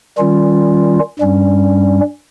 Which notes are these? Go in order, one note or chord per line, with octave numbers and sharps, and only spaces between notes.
D#3 G3 C#4 F4
G2 G3 C#4